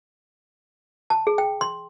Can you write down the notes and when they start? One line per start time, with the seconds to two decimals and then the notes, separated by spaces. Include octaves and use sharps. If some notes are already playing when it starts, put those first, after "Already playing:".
1.10 A5
1.27 G#4
1.38 G5
1.61 C6